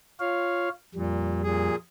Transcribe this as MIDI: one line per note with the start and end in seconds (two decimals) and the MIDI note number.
0.20 0.69 65
0.20 0.69 73
0.20 0.69 77
0.95 1.69 41
0.95 1.43 46
0.95 1.69 55
1.43 1.76 46
1.43 1.76 68